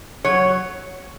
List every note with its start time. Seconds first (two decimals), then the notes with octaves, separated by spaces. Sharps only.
0.25 F#3 C#5